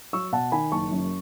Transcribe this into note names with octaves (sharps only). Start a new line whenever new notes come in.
F#3 C#6 E6
B2 F#5 A5
D#3 G#5 B5
F#1 A5 C#6
F#2